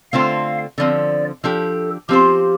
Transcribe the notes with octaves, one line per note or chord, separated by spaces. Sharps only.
D3 A3 C4 F4 C5 F5
D3 F3 C4 D5
F3 D4 G4 A4
F3 C4 F4 G4 C5